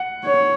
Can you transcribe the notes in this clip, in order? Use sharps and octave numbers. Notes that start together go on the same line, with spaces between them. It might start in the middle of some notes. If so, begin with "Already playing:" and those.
Already playing: F#5
C#5